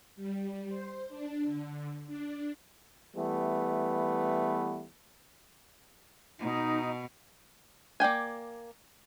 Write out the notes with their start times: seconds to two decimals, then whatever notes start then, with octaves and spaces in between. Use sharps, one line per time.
0.16 G3
0.68 C5
1.09 D4
1.43 D3
2.07 D4
3.16 E3 G3 A3 B3
6.40 B2 D#4
8.00 A#3 D5 G5 G#5